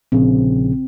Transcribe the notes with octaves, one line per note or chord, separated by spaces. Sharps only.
A#1 C#3 C4